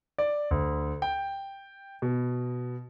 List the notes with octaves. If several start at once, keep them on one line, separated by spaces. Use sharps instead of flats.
D5
D2
G5
B2